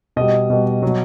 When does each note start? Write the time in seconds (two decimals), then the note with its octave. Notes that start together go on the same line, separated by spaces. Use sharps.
0.16 B2 G3 D#5
0.50 B2 G3
0.82 B2 F#3